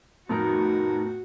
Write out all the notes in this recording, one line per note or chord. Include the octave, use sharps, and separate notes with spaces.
F2 A2 B3 D#4 F#4 A#4